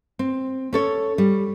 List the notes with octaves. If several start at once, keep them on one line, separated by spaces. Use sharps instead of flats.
C4
C#4 A4 C#5
G3